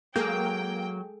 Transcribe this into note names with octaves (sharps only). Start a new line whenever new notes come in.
F#3 G#3 A#3 G#4 A4 G5 G6